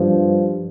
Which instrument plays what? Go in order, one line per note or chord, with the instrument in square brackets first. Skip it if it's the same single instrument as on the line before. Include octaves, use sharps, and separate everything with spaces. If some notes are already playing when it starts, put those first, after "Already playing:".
Already playing: [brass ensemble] G2 F3